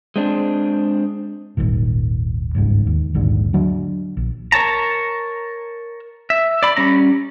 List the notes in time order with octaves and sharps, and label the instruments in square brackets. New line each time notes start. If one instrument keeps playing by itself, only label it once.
[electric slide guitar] G#3 C4 D4
[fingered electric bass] D#1 G#1 D#2 A#2
G1 C#2 G#2
D#2
A#1 D#2 G#2 D3
D3 F#3 D4
A#1
[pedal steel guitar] A#4 C#5 A5 A#5
E5
D5 B5
G3 C#4 A#5